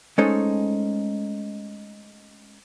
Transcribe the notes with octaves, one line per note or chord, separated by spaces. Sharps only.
G#3 A3 C#4 D#4 A4 C5